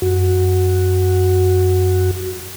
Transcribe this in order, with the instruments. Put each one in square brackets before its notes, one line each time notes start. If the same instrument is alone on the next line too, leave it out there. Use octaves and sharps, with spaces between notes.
[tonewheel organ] F#2 F#4